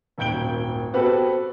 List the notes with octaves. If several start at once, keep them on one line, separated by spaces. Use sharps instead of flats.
D#1 G#1 G5 G6 D7 G7
B3 C4 F#4 G4 A4 B4